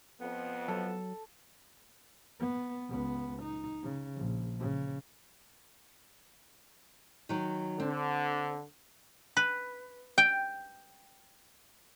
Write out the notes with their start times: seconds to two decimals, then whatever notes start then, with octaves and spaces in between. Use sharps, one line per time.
0.21 F2 B3
0.68 F#3 A4
2.40 B3
2.89 C#2 B3
3.42 D#4
3.83 C#3
4.16 A#1
4.60 C#3
7.29 D#3 F#3
7.80 D3 C4
9.37 B4
10.18 G5